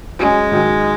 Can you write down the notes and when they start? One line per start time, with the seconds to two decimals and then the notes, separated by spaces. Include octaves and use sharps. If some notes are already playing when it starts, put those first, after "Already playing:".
0.19 F#3 G#3 C#4 G#4
0.51 G#2 D#3 F#3 D#4